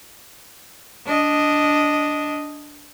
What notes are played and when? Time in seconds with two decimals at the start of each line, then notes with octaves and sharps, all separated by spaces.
1.06 D4 D#5